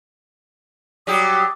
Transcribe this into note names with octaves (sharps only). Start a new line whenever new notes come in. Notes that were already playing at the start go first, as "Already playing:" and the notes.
F#3 G3 G4 D6 D#6